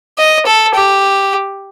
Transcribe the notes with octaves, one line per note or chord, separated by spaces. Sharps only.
D#5
A4
G4